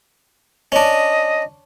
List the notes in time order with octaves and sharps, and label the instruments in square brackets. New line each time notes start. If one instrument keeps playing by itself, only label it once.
[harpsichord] C#4 D4 [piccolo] D#5